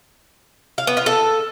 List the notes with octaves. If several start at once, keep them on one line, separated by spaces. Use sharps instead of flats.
F5
B3
F4
A4